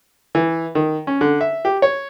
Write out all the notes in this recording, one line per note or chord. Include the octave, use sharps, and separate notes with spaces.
E3
D#3
C#4
D3
E5
G4
C#5